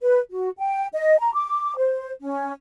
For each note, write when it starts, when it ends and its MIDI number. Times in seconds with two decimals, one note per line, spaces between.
0.02 0.20 71
0.30 0.49 66
0.59 0.87 79
0.94 1.19 75
1.19 1.33 82
1.34 1.76 86
1.77 2.11 72
2.21 2.51 61